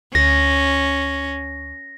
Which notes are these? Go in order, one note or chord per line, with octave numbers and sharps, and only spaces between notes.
D2 C#4 A#6